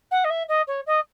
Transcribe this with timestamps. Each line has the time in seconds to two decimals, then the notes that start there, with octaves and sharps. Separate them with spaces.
0.11 F#5
0.24 D#5
0.30 E5
0.48 D#5
0.67 C#5
0.87 D#5